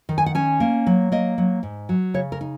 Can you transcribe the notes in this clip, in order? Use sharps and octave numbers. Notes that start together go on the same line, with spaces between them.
D#3
G#5
F#5
C#4 G#5
A#3
F#3
A#3 D#5
F#3
G#2
F#3
C#3 C#5
A#4
D#4